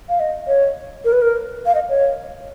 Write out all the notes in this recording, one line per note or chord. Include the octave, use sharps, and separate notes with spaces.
F5
D#5
C#5
A#4
B4
A#4
F5
D#5
C#5